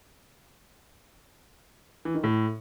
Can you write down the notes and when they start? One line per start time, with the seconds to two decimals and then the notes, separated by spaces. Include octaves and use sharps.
2.05 E3
2.14 D#3
2.24 A2